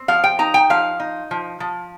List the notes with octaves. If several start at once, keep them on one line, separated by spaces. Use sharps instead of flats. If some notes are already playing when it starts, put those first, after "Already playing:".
Already playing: C4
F3 F5
G5
D#4 A#5
G5
F3 F5
D#4
F3
F3